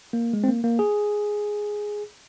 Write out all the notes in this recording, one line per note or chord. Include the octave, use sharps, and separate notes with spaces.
A#3
G#3
C4
A#3
A#3
G#4